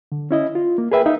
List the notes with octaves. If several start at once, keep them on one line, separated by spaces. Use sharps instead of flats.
D3
C#4 E4 D#5
F4
A#3
G#4 A#4 B4 E5 G5
D#4 E5 F5